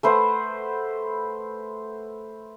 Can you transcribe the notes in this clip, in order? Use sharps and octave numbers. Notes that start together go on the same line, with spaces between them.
A3 B4 C5 F#5